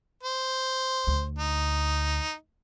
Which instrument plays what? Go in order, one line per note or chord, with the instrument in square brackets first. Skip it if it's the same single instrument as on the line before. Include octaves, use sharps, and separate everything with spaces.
[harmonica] C5
[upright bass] D2
[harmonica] D#4